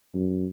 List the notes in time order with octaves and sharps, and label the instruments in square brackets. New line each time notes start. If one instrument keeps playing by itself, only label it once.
[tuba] F#2